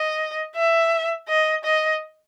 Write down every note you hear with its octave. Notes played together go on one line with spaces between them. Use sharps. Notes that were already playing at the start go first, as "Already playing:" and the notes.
Already playing: D#5
E5
D#5
D#5